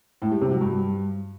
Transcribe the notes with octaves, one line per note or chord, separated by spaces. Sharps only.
A2
G3
C3
F#3
G2